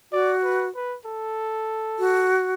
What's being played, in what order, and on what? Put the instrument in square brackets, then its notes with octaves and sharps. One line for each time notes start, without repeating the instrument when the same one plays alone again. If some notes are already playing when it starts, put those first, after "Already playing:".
[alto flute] F#4 [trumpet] D5
[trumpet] B4
B4
A4
[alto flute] F#4